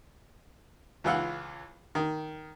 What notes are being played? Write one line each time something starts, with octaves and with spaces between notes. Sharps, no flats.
C#2 E3 F4 F#5
D#3